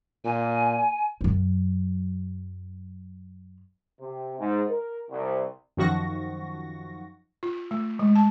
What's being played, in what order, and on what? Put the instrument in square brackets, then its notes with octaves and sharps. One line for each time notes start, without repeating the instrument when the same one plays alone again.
[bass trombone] A#2 [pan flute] G#5
[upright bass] F#2 F#3
[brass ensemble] C3
G#2
A#4
C2
[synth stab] F#2 D#3 F3 F#4 C#6 A#6
[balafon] F4
A3
G#3
A5